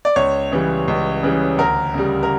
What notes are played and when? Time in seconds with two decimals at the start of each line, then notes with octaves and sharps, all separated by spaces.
0.05 D5
0.16 C#2 C#5
0.52 C#3 E3 G3
0.88 C#2
1.23 C#3 E3 G3
1.58 D2 A#4
1.94 C#3 G3
2.23 A#4